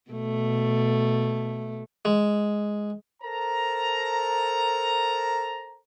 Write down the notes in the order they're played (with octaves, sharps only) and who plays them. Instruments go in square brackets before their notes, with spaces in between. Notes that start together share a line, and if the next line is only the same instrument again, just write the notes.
[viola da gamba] B2 A3
[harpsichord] G#3
[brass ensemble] A4 A#4 C5 A5 A#5